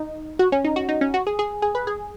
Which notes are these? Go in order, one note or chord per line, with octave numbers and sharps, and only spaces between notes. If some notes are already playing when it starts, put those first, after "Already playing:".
Already playing: D#4
F#4
C#4
D#4
F#4
D#4
C#4
F#4
G#4
G#4
G#4
B4
G#4